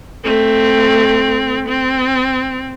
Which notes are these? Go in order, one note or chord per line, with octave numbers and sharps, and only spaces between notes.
A3 C4
C4